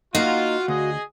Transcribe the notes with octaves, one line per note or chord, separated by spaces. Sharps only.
A#3 D#4 F4 F#4 F5
D2 G#4 D#5